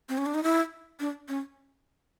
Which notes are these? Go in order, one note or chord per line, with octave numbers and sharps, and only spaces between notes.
C4
C#4
D4
D#4
E4
D4
C#4